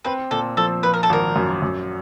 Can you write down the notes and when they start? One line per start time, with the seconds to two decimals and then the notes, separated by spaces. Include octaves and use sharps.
0.05 C4 B4
0.31 A#2 A4
0.57 F3 A4
0.83 F3 B4
0.94 A#4
1.03 A4
1.09 G#1 A#4
1.36 F#2
1.62 F#2